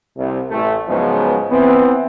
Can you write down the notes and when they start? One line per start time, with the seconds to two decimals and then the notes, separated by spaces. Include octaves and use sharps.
0.17 C2
0.50 A1 A3
0.89 G#2 C#3 F3 F#3 G#3 B3
1.51 E3 B3 C4